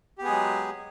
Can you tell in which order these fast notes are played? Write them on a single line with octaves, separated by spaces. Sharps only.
G4 B3 G#4 G#3 F#3